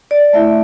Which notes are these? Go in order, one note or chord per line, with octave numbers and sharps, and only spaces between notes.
D5
A3 E4 E5